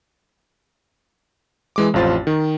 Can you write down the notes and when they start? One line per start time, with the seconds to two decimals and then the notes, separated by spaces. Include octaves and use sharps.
1.76 E3 G#3 D6
1.94 A1 F2 F4 C5 A6
2.27 D#3